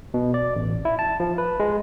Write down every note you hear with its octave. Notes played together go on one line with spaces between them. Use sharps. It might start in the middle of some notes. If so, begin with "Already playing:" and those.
B2
D5
A1
E4
A5
F3
B4
G#3